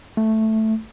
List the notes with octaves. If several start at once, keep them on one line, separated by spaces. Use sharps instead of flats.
A3